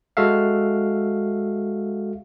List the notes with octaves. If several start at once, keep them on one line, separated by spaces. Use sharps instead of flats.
G#3 F#4 A4 E5 F5